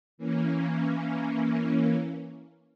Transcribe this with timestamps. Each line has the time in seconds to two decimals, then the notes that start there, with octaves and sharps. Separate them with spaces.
0.18 E3 A#3 C#4